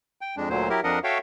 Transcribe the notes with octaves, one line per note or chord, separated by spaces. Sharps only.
G5
F2 G#3 D4
D2 A#2 D3 F#3 C5
F#3 E4 G4 A#4
F2 F3 D4 A#4 D#5 F#5
F#4 A4 C#5 E5 F5 G5